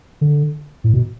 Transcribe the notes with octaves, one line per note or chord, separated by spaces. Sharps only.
D3
A2
B2